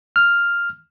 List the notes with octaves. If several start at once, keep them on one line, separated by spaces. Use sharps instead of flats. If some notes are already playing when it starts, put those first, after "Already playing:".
F6